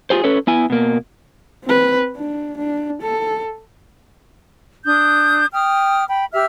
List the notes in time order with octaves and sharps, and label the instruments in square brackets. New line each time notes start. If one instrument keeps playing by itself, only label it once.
[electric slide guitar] F4 G4 G#4 C5
C#4 A4 B4 C#5
B3 E4 G#5
B2 A#3
[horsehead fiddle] C4 B4
D4
D4
A4
[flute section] D4 D#6 G6
G5 D#6 F6
G5 B5
G4 E5 E6 F6